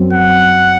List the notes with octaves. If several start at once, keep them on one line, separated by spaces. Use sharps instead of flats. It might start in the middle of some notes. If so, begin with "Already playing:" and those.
Already playing: F#2 F#3 C4
F#5